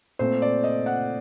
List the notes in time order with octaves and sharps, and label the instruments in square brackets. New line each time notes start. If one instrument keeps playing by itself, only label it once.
[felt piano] A#2 A3 C4 C5
D5
D#5
F#5